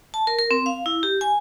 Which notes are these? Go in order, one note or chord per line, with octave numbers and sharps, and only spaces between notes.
A5
A#4
A#4
C4
F5
E4
G4
G#5